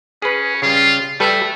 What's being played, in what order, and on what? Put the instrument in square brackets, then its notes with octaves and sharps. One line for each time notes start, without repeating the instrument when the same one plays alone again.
[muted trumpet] C#4 [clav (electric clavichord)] G#4 B4
[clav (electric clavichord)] C#3 G3 [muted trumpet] F4
[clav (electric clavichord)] G3 A4 B4 [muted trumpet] A3